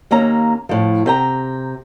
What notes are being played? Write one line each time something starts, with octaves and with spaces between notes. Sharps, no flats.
D#2 A#3 C#4 A#5
A2 F3
C3 G5 A#5